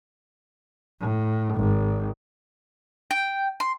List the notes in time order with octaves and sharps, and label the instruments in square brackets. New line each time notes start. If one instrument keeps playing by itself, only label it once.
[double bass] A2
G#1
[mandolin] G5
C6